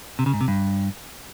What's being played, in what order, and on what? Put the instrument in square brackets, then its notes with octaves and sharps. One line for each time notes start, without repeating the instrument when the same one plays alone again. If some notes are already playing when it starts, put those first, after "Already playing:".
[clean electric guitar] C3
C#3
G#2
C3
G2